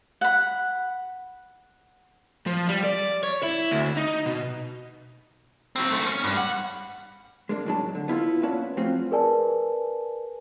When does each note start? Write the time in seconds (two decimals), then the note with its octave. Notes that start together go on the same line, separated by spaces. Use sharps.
0.21 F#5 B5
2.46 F3
2.68 G3
2.84 D5
3.23 C#5
3.43 E4
3.72 D2
3.97 D#4
4.26 B2
5.76 F#3 C4
5.89 A3 C4
6.07 C#4
6.24 G2
6.37 F#5
7.49 G#3 A#3 D4
7.65 A2 D3 F#3 G#3 D4 A5
7.95 D3
8.08 B3 E4 F4
8.43 A#3 C#4 D4 B4 E5 A5
8.77 F3 A3 C4 C#4 F4 F#4
9.11 G#4 A#4 B4 D5 G#5 A5